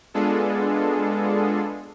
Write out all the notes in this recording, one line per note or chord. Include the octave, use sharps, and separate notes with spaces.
G#3 B3 D4 F4 G#4 A4